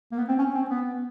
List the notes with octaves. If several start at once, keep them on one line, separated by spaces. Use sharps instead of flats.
A#3
B3
C4
C#4
C4
B3